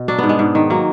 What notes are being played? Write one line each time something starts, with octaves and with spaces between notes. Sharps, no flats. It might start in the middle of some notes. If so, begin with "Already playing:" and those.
Already playing: B2
F#3 D4
G#2 B3
G#3
G#2
D#3
F#3 A#3